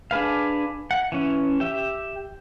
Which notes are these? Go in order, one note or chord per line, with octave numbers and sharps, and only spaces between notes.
D4 G#4 B4 F5
F#5
E3 C#4
G4 E5